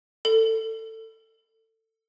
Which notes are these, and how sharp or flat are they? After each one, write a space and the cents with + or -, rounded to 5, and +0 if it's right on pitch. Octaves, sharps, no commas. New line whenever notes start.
A4 +20